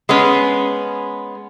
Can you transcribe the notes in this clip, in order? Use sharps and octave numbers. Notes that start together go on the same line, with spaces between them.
G#3 B3 C#4